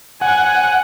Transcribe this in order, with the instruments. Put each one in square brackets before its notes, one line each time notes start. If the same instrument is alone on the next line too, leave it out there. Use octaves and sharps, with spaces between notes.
[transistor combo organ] F#5 [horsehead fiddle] G#5